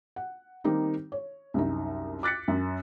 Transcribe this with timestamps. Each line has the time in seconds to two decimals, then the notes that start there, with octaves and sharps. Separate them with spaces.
0.16 F#5
0.64 D#3 G3 A#3 C4 D#4 G4
1.12 C#5
1.54 C2 F#2 D#4
2.23 D6 F#6 A6 B6 C#7
2.48 F#2